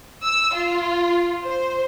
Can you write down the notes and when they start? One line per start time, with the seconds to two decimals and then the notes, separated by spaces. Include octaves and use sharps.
0.24 E6
0.55 F4
1.45 C5